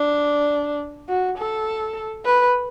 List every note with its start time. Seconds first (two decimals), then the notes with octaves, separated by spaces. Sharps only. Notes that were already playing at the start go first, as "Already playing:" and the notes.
Already playing: D4
1.09 F#4
1.38 A4
2.25 B4